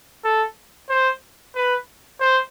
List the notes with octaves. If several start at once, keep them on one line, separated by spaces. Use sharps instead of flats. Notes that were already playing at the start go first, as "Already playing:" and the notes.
A4
C5
B4
C5